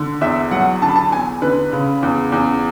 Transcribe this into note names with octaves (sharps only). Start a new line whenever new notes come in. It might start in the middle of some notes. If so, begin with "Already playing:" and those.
Already playing: D3
E2 E5
F#3 F#5
D3 A5
B5
A5
E2 G#5
D3 B4
C#3
E2
E2